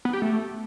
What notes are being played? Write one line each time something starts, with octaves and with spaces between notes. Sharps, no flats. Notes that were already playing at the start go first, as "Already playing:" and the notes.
B3
G4
A3